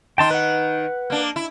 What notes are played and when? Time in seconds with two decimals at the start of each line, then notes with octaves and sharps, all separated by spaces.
0.18 D#3 D#4 G5 A5 C6
0.31 B4 F#5
1.10 A#3 D4
1.36 E4